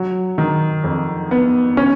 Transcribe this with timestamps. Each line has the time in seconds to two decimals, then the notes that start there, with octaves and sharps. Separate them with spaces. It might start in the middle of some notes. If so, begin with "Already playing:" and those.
Already playing: F#3
0.38 D#3
0.84 F2
1.31 B3
1.77 C#4